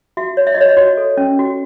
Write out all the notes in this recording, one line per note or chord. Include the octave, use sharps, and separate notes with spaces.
F#4 E5
C#5
E5
D#5
F#4 C#5
D#5
F#4 C#5
A4
C#4
F#4